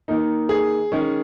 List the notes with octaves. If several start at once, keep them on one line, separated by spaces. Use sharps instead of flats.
D#3 A#3 D#4
G#4
D#3 G#3 C#4